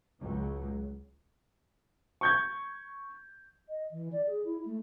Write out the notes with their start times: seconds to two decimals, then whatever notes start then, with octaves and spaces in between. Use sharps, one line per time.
0.19 C#2 F#3
2.21 C#6 G6 G#6
3.69 D#5
3.91 E3
4.12 D5
4.27 G#4
4.44 E4
4.65 A3